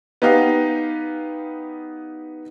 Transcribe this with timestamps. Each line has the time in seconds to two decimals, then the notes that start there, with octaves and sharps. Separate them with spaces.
0.22 B3 D#4 G4 F5